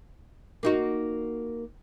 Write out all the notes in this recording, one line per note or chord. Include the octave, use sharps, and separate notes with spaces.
A#3 D#4 F#4